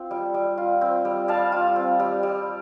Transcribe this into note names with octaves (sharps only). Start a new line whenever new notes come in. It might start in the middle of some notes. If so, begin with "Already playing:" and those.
Already playing: C4 F4
G3
G3
F4
C4
G3
G3 F5 A5
F4
C4
G3
G3